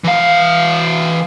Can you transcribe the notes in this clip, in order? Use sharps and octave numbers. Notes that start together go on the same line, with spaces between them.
E3 F5